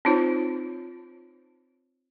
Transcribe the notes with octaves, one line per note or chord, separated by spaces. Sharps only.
C4 D#4 F4 C5 C#5